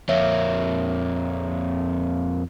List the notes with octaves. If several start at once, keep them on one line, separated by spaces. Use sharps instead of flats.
F2 A#3 C#5 E5